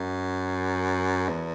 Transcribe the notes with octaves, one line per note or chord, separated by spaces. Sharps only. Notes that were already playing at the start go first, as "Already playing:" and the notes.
Already playing: F#2
E2